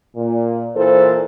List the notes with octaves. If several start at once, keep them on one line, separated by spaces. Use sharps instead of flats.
A#2
A#2 E3 A4 C5